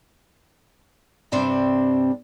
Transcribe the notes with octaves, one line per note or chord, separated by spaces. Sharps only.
G2 C3 G3 C4 D4